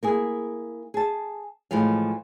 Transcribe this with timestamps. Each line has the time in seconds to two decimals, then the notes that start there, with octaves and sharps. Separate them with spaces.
0.03 A#3 E4 G#4
0.94 G#4 A5
1.71 A2 E3 F3 G#3 F5